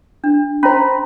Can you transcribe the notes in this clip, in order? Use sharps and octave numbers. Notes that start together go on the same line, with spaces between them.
D4
C#4 C5 A#5 B5